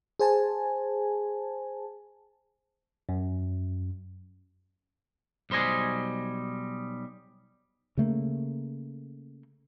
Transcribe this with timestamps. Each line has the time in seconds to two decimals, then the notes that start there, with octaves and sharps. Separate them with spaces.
0.19 G#4 C5 G#5 A5
3.09 F#2
5.50 B1 G3 C5 D#5 G#5
7.97 C#3 A3 A#3